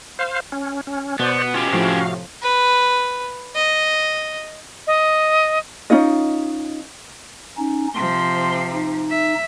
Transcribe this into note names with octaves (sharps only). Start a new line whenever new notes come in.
C5 F5
C#4
C#4
B2 B3 C5 D5
C#4 F4 G4
A2 C3 F3 F#4 F5
B4
D#5
D#5
C#4 D#4 F4 D#5
C#4 D#4
C3 F3 C6
D#4
E5